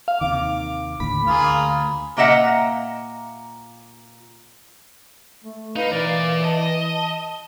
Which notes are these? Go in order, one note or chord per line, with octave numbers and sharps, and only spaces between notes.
F5
D#2 C3 D#3 D6
D#2 A2 D3 B5
D2 A#3 F4 G#4
A#2 A#3 D#5 E5 F#5 A#5
A3
D#4 B4 F5
E3 A#4 D5
D#5 A5